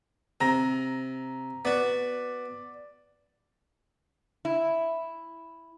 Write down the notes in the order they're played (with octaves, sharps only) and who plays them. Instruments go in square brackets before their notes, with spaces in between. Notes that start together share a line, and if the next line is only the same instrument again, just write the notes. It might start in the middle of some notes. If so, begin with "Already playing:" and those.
[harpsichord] C3 [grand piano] A#5 A#6
[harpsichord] B3 F#4 [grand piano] D5
[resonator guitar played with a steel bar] E4